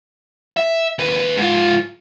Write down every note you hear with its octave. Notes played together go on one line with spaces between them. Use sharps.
E5
D#2 B4
G#2 F4